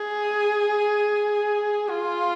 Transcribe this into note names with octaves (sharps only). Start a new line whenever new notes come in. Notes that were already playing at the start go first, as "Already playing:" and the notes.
Already playing: G#4
F4